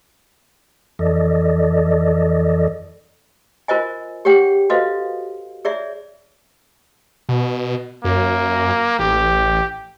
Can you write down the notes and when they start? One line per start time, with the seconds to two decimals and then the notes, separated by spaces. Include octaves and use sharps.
0.99 F2 E3 A4 D5 D#5
3.68 F4 A#4 C5 D#5 G#5
4.25 G4 G#4 C#5 F#5 G5
4.70 F#4 A4 B4 C5 D#5 F5
5.65 G#4 C#5 D5 E5
7.29 B2
8.04 F#2 A#3
8.99 A1 G4